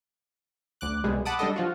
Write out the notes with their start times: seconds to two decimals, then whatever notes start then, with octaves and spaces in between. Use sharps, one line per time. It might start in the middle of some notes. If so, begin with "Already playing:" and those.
0.81 D2 D6 F#6
1.04 C2 B2 G#3
1.25 F#5 A5 B5 D6 D#6
1.39 G3 D4 A4 D#5
1.56 F3 F4 F#4